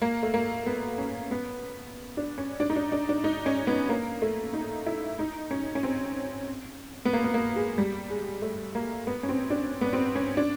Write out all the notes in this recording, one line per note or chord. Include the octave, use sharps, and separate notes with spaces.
A#3
A3
A#3
B3
C#4
B3
D4
C#4
D4
D#4
D4
D4
D4
D#4
C#4
B3
A#3
A3
D#4
E4
D#4
C#4
C#4
C4
B3
A#3
B3
A#3
G#3
G3
G#3
A3
A#3
B3
C#4
C4
D4
B3
C4
C#4
D4